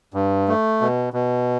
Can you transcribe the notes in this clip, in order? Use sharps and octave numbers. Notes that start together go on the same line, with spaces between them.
G2
A3
B2
B2